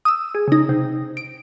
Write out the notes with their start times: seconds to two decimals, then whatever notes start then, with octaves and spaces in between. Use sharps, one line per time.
0.05 D#6 E6
0.35 G#4
0.48 C#3 D#4
0.69 C3
1.17 D7